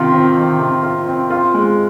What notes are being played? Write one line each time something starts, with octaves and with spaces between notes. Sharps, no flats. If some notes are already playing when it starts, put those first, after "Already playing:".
Already playing: C3 D#3 F4
C4
D#3
C3
F4
C4
F4
G#3